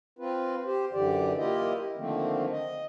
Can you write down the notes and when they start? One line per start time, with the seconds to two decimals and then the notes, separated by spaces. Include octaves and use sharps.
0.19 C4 F4 B4
0.65 G4 C5
0.93 F#2 D3 E3 G4 D5
1.38 A#3 E4 F4 G4 D#5
1.97 D3 D#3 F3 A3 A#3 C4
2.51 D#5